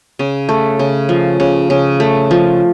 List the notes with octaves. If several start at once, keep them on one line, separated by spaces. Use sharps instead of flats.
C#3
A3
C#3
F3
C#3
C#3
A3
F3